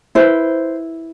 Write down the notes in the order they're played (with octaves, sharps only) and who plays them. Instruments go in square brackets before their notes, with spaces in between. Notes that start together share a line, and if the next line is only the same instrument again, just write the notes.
[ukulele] E4 B4 C5